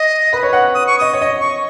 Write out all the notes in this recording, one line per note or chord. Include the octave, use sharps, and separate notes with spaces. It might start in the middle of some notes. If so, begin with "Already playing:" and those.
Already playing: D#5
B4
C#5
F#5
D#6
C#6
D#5 D#6
C#5
D#5
C#6